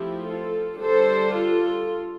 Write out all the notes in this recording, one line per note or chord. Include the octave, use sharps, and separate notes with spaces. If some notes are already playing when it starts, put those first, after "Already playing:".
Already playing: F3 A3 C4 E4 G4
F4 A4
D3 G3 D4 A4 C5
F4 A4